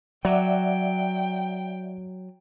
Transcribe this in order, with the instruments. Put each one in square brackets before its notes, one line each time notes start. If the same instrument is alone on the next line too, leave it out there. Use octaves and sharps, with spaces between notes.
[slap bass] F#3 [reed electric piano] D5 E5 F#5 [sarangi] G5